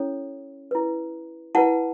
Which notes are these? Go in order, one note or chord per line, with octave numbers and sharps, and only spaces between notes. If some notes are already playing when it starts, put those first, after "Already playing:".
Already playing: C#4 E4 A4 C#5
E4 B4
E4 B4 F#5 A5